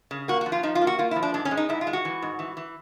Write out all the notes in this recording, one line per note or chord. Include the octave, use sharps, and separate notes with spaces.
C#3
A#3 F#4
F#4
F3
F4
F3 D#4
F4
A#3
F#4
A#3 F4
E4
F3
D4
G#2 D4
C#4
G#3
D#4
G#2 E4
F4
G#3
F#4
E3
G#2
E3
E3